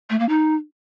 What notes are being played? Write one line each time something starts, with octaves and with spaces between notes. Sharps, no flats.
A3
A#3
D#4